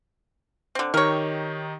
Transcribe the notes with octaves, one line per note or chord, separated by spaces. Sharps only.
D3 C4
D#3 D#4 G4 A#4 C#5